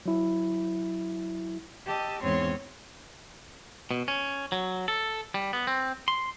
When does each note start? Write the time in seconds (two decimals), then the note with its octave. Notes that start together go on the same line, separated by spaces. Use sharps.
0.06 F#3 E4
1.86 G4 D#5 A5 E6
2.22 E2 G#2 C4 C#4 C#5 C6
3.91 B2
4.08 C#4
4.52 F#3
4.88 A4
5.34 G3
5.53 B3
5.67 C4
6.08 C6